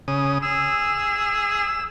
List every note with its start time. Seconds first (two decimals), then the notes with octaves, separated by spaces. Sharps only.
0.08 C#3 D#6
0.42 G#4 E6